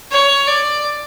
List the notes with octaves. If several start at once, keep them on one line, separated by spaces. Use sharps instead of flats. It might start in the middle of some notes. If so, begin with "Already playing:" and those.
C#5
D5